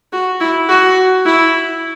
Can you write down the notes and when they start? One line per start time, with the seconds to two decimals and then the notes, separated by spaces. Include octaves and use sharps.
0.12 F#4
0.40 E4
0.69 F#4
1.26 E4